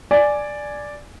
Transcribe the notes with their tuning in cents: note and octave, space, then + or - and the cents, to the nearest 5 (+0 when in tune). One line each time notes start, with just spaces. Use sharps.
D5 +0 G#5 +5